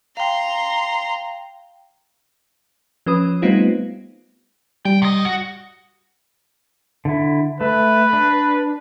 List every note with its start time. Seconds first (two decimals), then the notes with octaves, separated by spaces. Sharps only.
0.17 F5 G5 A#5 C6
3.06 F3 C#4 B4 D#6
3.42 G3 A3 B3 C4 D#4 F4
4.85 G3 G5
5.02 C3 D#5
5.25 F#4
7.05 D3 E4
7.61 A3 B4
8.13 D4